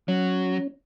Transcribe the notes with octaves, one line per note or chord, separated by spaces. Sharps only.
F#3 C#4